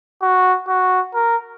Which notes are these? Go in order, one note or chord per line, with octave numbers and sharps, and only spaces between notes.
F#4
F#4
A#4